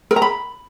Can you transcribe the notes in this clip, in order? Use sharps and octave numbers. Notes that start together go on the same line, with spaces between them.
A#4
A#5
B5